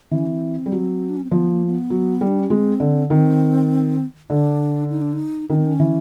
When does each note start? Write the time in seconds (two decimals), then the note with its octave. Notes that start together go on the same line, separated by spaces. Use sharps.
0.11 E3 C4
0.18 C#4
0.27 C4
0.66 G3
0.72 F#3
1.09 D4
1.17 C#4
1.24 C4
1.31 F3 B3
1.50 A#3
1.66 A#3
1.71 B3
1.90 F#3
2.21 G3
2.27 D4
2.39 C#4
2.50 G#3 C4
2.80 D3
3.10 D#3 C4
4.30 D3 D4
4.90 D#4
5.01 D4
5.13 D#4
5.50 D#3 C#4
5.57 C4
5.66 C#4
5.80 E3